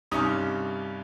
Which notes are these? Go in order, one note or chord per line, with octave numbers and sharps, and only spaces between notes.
C2 G2 C#4 D#4 D#6